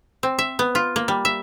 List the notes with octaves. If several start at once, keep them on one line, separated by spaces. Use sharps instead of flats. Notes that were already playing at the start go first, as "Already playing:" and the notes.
C4
E5
B3
F4
A#3
G3
E5